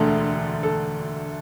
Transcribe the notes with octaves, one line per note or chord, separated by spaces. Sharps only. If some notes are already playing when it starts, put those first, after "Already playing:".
Already playing: E1 D2 D3 A3 A4
A4